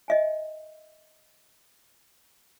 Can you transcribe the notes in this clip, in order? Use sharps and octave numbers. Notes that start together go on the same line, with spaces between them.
D#5 E5 G#5